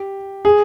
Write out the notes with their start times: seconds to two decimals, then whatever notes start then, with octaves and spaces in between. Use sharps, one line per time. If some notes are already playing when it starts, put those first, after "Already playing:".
Already playing: G4
0.45 G#4